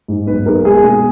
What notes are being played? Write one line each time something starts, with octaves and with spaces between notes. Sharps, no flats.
G#2
B1 B4
B1 A#4
G#3 G#4
B2